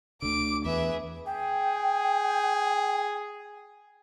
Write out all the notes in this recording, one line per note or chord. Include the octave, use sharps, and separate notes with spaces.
D2 D3 D6 D7
E2 G#4 B4 E5
G#4 G5